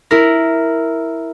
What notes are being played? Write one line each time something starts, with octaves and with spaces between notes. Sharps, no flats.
E4 A#4